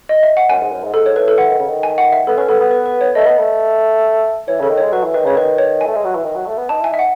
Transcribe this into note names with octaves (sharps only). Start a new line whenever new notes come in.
D#5
E5
F#5
F#2 G#5
G#2
F#2
G#2
G#2 A4
C#5
A2 B4
A4
E3 F#5
D#3
C#3
D#3
G#5
F#5
E5
B3 A4
C#4 B4
B3 A4
B3
B4
B4
C#5
A3 D#5
B3
A3
E3 C#5
C#3 A4
D#3
G#3 C#5
F#3 B4
E3
D#3 B4
C#3 C#5
D#3 B4
C#5
A3 G#5
G#3
F#3
E3
D#3
F#3
A3
B3
D#4 A5
E4 G#5
D#4 E5
F#5